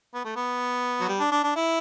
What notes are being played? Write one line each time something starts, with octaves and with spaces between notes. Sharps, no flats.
B3
A3
B3
F#3
G3
D4
D4
D4
E4